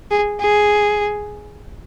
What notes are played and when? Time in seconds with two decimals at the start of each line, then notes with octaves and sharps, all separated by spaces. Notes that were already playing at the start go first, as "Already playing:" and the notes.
0.11 G#4
0.40 G#4